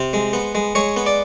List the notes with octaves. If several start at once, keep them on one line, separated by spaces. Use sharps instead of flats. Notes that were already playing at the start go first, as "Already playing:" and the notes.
Already playing: C3 C5
G#3
B3
G#3
G#3 C#5
B3
D5